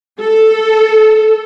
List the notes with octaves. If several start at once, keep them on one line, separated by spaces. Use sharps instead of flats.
A4